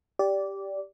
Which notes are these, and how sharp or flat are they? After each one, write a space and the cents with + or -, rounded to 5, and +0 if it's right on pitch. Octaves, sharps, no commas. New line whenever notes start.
G4 +0 D5 -15